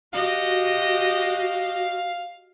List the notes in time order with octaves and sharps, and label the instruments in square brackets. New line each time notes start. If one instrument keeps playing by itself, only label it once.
[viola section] F#4 [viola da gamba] G4 D#5 [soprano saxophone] F5